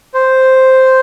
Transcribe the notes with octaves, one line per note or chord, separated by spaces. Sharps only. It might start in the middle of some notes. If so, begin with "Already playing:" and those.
C5